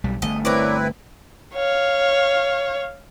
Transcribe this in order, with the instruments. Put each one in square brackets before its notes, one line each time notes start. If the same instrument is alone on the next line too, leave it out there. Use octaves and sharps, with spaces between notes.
[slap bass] B1 G3
[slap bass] G1 A3 [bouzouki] D#5
[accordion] C4 E4 B4 [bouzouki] A#4 C#5 D5
[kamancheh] C#5 F5